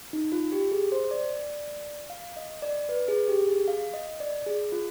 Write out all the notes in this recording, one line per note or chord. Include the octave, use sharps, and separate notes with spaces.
D#4
F4
G4
G#4
C5
D5
F5
D#5
D5
B4
G#4
G4
G#4
F5
D#5
D5
G#4
F4